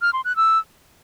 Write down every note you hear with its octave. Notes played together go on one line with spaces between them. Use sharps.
F6
C6
F#6
E6